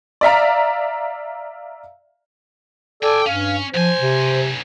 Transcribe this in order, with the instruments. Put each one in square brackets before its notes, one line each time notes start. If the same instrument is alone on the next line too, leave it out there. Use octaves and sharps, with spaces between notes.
[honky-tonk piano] D5 E5 F5 A#5
[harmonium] A4 D5 [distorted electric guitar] G5 G#5
[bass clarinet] G2 [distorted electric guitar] C#4 [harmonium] F5
[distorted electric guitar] B1 G#5 [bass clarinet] F3 [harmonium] C5
[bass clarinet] C3